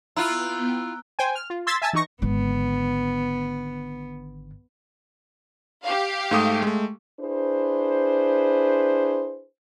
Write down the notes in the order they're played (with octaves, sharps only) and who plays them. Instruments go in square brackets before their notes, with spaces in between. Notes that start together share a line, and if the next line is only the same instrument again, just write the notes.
[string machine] B3 G5 [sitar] E4 F4 [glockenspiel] A#5 E6 F#6
[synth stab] C5 G5 G#5
F6
F4
C6 E6 G#6 A6 B6
E5 G#5 A5 E6 A6
E3 D#4 C#6 A#6
[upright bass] G#1 D3 [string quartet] B3
[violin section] G4 F5
[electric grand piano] G#2 A3 D#6
G#3 A3
[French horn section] D4 E4 G#4 B4 C5